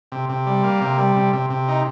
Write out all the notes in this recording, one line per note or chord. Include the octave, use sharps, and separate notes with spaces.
C3
C3
G3
A#3
C3
G3
C3
C3
C3
D#4